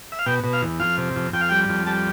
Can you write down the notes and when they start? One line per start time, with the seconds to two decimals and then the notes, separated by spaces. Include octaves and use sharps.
0.12 E5
0.19 F5
0.26 B2 G5
0.44 B2
0.53 F5
0.62 E2
0.80 F2 F5
0.98 C3
1.16 F2
1.33 F2 G5
1.41 F5
1.49 G3 G5
1.69 F2
1.87 G3 A5